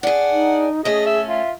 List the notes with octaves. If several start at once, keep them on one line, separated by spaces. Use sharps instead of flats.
D4 G#4 F#5
D#4
A3 C#4 G#4 D#5
E5
F4 E5